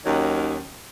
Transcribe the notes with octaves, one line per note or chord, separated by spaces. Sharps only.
D#2 D#3 F#3 C#4